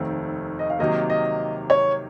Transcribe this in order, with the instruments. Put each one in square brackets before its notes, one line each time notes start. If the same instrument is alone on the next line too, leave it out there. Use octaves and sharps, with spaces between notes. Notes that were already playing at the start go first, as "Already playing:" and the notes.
Already playing: [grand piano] F1 D#2 D#3 A3 C4
[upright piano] D#5
F5
[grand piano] C3 D#3 F#3 A#3 [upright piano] D#5
[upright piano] D#5
C#5